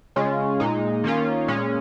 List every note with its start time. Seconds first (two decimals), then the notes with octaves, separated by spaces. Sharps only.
0.16 C#3 G#3 C#4 F4
0.60 A#2 G#3 D#4
1.04 D#3 A#3 C#4 F4
1.48 A#2 G#3 C#4